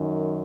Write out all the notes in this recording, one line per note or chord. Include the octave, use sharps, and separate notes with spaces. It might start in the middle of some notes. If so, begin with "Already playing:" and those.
Already playing: F#2 D#3